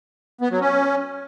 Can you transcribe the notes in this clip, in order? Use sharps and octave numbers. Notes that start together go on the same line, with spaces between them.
B3
F#3
C#4